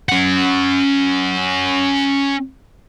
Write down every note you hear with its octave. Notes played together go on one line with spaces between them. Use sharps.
C#4 F#5